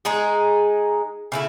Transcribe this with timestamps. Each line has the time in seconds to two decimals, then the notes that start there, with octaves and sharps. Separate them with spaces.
0.05 G#3 D#4 G#4
1.32 C#3 A3 E4